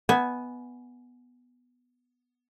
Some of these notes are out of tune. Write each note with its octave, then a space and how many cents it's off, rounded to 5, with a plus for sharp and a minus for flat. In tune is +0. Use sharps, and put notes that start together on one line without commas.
B3 +0 E5 -20 G#5 +5